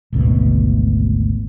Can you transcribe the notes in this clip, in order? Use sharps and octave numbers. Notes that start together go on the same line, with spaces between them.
G#1 D2 B2